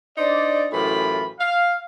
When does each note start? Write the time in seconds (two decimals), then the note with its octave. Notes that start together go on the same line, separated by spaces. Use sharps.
0.18 D4 D#4 C5 D5
0.72 F#2 A2 E3 F4 G4 B5
1.39 F5